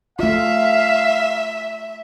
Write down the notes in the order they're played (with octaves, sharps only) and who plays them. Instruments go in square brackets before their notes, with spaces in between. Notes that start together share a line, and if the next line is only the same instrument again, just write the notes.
[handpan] A3 F4 [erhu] E5 [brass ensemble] F5